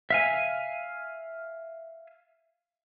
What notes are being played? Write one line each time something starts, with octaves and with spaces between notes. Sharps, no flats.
E5 F5 G#5